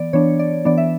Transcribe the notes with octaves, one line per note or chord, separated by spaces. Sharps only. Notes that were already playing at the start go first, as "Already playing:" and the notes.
Already playing: E3 B3 D5
E3 B3 D4 C#5
D5
E3 B3 D4 D5
E5